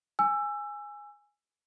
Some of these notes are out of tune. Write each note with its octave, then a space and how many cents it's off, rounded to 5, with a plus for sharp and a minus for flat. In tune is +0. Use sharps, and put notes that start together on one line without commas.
G#5 -5 E6 +20